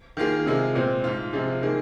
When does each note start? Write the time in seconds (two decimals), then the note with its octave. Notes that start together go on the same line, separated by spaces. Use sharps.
0.17 D#3 A#3 F4 G#4
0.46 C3 G#3 F4 G#4
0.75 A#2 G#3 C4
1.04 G#2 G#3 F4
1.33 C3 F3 G#3 F4 G#4
1.62 D#3 A#3 D#4 G#4